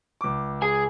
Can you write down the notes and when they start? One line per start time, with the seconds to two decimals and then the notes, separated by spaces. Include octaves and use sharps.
0.21 C#2 D6
0.62 G#4 G#5